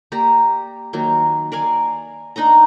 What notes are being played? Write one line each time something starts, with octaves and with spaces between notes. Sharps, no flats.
A#3 G4 D5 A#5
D#3 F#3 A#3
A#4 D5 F5 G#5
D4 D#4 D#5 A#5